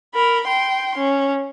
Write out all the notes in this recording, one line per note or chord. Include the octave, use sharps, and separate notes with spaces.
A#4 B5
G5 C6
C#4